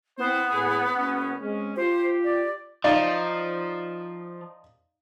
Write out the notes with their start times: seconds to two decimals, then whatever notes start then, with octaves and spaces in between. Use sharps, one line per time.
0.18 B3 C4 E4 C5
0.51 A2 G#4
0.96 F#1 C#4
1.41 G#3 C4 C#4
1.76 F4 G4 C5
2.24 D5
2.84 F3 D#4 D5 F5